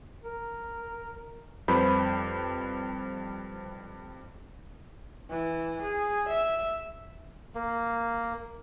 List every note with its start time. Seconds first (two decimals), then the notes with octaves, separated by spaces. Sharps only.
0.23 A#4
1.68 F2 G3 B4 C5 B5 G6
5.30 E3
5.83 G#4
6.29 E5
7.55 A#3